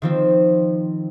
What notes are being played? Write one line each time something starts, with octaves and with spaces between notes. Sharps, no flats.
D#3 F3 C4